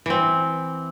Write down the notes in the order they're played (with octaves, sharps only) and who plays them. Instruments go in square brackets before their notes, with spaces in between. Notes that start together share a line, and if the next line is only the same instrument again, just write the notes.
[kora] E3 C4